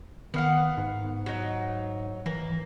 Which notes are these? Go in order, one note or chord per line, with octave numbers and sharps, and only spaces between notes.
D#3 B3 F5 F#5
G#2
F#3 D#4
E3 A#3